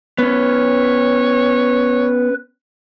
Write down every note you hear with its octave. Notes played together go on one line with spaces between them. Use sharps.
B3 C#4 B4 C#5